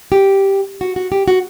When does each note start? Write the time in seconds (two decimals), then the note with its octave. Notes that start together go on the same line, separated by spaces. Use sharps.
0.12 G4
0.81 F#4
0.96 F#4
1.12 G4
1.28 F#4